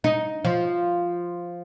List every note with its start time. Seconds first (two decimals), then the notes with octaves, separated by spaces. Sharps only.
0.04 D#4
0.45 F3